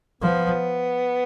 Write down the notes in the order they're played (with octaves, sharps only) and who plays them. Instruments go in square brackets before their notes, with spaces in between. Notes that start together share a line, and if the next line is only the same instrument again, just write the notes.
[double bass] F3 [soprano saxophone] B3